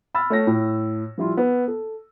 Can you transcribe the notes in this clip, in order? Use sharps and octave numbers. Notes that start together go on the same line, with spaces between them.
B5 E6 F6 A6
A3 C#5 A#6
A2
F3 G3 E4 F4
B3
A4